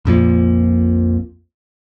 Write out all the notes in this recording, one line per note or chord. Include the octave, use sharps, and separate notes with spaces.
A#1 F2 A#2 F3